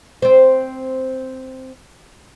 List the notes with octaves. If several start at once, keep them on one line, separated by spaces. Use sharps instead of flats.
C4 C5